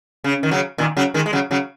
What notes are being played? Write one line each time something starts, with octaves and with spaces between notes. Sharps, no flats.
C#3
D#3
C#3 F#3
A#2 D#3
C#3 F#3
D#3 G#3
G#3
C#3 F#3
C#3 F#3